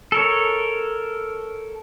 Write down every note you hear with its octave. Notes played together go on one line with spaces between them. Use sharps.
A4 A#4 C#5